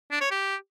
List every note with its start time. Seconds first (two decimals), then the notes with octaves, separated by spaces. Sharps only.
0.11 D4
0.21 C#5
0.31 G4